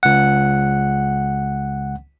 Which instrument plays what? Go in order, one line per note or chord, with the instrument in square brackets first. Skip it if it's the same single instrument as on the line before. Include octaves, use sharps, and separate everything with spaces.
[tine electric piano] C#2 F#5